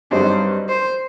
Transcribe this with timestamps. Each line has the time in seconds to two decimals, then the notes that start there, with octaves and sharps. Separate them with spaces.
0.11 G2 F#3 C4 D#4 C5
0.69 C5